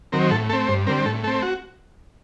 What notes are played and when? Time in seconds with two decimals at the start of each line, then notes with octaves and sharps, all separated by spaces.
0.12 D#3 F#3 C4 A#4
0.31 A2 A4
0.50 A3 A4
0.53 C4
0.68 G2 C5
0.87 D3 G3 C4 A#4
1.06 A2 A4
1.24 A3 A4
1.27 C4
1.42 F#4